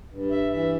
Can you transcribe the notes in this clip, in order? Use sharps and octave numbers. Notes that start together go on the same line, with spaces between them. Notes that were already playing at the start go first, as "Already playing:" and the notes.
G2
E5
E3 E5